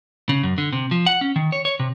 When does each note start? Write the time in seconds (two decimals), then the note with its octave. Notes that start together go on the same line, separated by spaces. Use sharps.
0.29 C#3
0.43 F#2
0.58 D3
0.73 C3
0.91 F3
1.06 F#5
1.21 C#4
1.36 D#3
1.52 C#5
1.65 C#5
1.80 C3